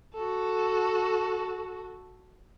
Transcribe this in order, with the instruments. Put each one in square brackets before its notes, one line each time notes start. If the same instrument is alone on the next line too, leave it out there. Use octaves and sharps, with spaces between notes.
[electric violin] F#4 A4